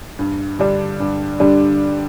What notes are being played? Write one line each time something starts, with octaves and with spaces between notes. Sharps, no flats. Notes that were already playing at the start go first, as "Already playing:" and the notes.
G2
D3 G3 D4
G2
D3 G3 D4